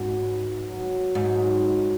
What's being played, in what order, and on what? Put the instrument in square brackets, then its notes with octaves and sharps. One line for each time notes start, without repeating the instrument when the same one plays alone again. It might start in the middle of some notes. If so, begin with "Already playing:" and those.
Already playing: [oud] G#2 [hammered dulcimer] C#4 F#4
[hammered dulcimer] B4
F#3
[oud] G#2 [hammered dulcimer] F#3